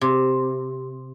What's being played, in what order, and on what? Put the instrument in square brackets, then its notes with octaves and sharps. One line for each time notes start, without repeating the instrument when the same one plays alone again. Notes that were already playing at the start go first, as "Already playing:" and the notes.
[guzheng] C3